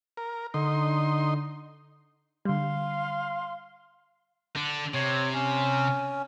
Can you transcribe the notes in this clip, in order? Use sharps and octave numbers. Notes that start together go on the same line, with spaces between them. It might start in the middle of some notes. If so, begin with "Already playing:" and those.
A#4
D3 D#4 C6
D3 G3 F5 C6
D3 D4
C3 C#5
C#4